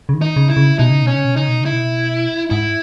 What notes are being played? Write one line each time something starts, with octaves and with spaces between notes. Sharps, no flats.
C#3
D#3
D#4
C#3
E4
C#3
B2 D#4
C#3
B2 C#4
C#3
B2
C#3 D#4
B2
C#3 E4
B2
G#2 E4